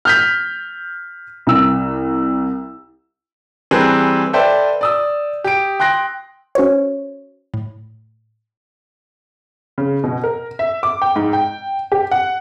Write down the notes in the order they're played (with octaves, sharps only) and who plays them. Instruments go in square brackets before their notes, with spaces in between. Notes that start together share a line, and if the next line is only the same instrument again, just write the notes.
[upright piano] F6 G6 B6
C2 E6
E3 G3 C4 G#4 A#4 B4
A4 B4 C5 D5 E5 G5
D5 D#6 E6
G4 D7
G5 C6 F#6 A#6
[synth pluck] C#4 F#4 C5 C#5
A2
[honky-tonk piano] C#3
B2
A#4
E5
D6
G5
G#2
G5
G4
F#5